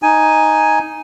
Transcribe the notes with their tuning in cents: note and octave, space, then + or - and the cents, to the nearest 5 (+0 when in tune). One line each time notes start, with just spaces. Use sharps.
D#4 +0 G#5 +0